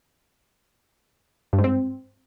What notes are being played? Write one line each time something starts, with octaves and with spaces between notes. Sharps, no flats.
G2
G#2
C4